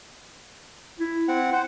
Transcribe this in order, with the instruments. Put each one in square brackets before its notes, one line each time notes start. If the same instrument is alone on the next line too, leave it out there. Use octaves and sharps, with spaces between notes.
[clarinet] E4
[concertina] C4 F#5
[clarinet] E4
[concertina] C5 [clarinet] F#5